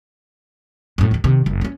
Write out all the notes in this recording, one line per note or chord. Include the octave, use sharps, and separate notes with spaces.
F#2 A2
D#2 D#3
C3 D#3
F#1 F#2
A#3 C#4